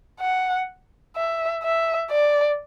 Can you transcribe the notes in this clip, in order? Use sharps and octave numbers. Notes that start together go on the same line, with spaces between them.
F#5
E5
E5
D5